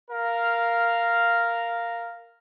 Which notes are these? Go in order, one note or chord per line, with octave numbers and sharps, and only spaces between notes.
A#4 F5